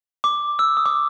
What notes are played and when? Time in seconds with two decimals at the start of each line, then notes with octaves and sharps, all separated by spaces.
0.24 D6
0.59 E6
0.77 D#6
0.86 D6